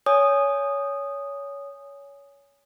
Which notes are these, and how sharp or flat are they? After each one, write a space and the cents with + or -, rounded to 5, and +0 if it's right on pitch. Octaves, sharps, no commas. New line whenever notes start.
C#5 +20 G#5 +0 D#6 -10